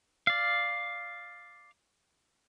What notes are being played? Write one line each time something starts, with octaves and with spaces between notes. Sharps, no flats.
D5 F5